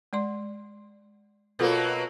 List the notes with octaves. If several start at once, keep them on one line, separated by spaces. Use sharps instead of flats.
G#3 D5 C6
B2 F#3 A#3 F4 A4 B4